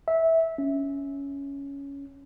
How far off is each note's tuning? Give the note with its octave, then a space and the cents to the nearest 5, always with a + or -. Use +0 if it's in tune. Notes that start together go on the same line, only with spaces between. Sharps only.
E5 -15
C#4 +10